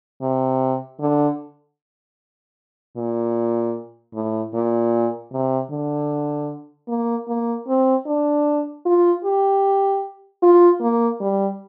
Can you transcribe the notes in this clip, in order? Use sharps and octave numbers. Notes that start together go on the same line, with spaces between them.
C3
D3
A#2
A2
A#2
C3
D3
A#3
A#3
C4
D4
F4
G4
F4
A#3
G3